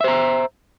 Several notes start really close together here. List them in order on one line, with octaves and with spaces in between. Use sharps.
E5 C5 A#5